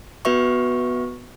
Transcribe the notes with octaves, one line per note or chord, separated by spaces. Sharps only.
B3 F#4 B4 E5 C#6